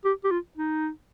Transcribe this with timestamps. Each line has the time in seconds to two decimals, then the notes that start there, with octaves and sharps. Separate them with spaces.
0.05 G4
0.24 G4
0.31 F4
0.57 D#4